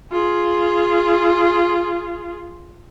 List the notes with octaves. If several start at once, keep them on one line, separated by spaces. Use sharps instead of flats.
F4 G#4